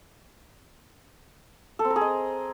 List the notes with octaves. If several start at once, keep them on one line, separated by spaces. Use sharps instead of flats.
A4
C4
A#4
G#4
D#5